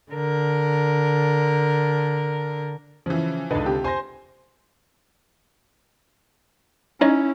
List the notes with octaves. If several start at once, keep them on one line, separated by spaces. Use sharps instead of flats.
D3 A#4
C#3 E3 F3
C#2 D3 D#4 B4
C3 G4
C5 G#5 C6 A#6
C#4 D#4 E4 C#5 D#5